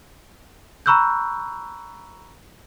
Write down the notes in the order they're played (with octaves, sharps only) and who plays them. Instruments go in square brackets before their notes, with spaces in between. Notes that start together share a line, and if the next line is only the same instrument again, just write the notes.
[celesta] A#5 B5 C#6 E6 F#6 G6